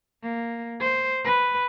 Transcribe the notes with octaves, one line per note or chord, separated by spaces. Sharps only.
A#3
C5
B4